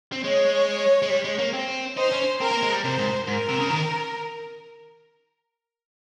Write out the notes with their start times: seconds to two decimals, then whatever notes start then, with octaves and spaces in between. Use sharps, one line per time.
0.12 C4
0.24 G#3 C#5
1.02 G#3
1.10 G3
1.24 G#3
1.39 A#3
1.53 C4
1.97 D#4 C5
2.12 C#4
2.40 C4 A#4
2.51 A#3
2.63 G#3
2.73 G3
2.84 C3 C5
2.98 G#2
3.27 G#2 A#4
3.49 C3
3.60 C#3
3.70 D#3